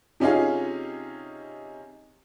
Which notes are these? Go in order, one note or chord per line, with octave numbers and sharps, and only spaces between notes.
C3 C#4 D#4 F4 G#4